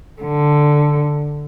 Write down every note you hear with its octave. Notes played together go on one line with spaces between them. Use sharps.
D3